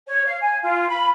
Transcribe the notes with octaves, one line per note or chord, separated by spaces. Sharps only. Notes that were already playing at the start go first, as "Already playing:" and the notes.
C#5
F5
G#5
F4
B5